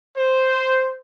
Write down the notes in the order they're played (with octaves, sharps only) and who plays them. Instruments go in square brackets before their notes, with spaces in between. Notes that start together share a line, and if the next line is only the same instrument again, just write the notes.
[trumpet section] C5